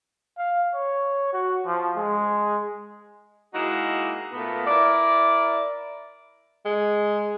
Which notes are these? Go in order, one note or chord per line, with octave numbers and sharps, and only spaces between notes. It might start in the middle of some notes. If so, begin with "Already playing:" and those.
F5
C#5
F#4
F3
G#3
G#3 A#3 D#4 E4 F#4
A#2 A3 B3
E4 A#4 D5
G#3